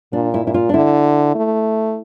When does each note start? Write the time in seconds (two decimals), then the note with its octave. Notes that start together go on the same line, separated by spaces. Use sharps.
0.13 A#2 D4
0.34 E4
0.44 A#2 E4
0.54 F4
0.69 D4
0.74 D3 E4
1.35 A3